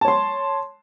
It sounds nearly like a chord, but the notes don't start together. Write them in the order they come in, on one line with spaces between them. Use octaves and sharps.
A5 C#5 C6